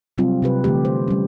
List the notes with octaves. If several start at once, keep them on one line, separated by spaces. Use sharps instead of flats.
C3 F#3 G3 C4 F4
C3 G4 B4
D3 E3 A3 G4
C5
G3 C#4